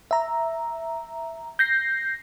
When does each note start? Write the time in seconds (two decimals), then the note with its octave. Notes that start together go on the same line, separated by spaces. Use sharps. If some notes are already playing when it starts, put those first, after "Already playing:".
0.11 E5 A#5
1.59 G6 A#6 C7